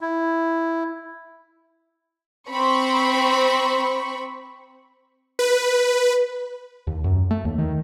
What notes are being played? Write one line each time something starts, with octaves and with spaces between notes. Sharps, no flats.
E4
C4 B5 C#6
B4
D#2
F#2
A3
D#2
D#3